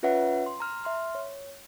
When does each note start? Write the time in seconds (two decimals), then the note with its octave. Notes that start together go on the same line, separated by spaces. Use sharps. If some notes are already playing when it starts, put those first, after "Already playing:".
0.03 C#4 F4 B4 C#5 E5 F#5
0.46 C6
0.60 A#5 F6
0.84 E5 C6 F6
1.15 C#5